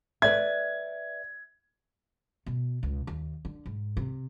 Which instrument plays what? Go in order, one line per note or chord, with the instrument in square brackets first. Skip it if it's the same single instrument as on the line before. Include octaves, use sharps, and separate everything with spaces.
[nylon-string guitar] B4 D5 E5 [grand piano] G#6
[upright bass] B2
C#2
D#2
D3
G#2
C3